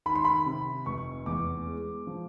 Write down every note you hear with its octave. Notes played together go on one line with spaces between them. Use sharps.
D#3 B5
C6
B5
C3
F1 C#6
E2 D6
G#3
F3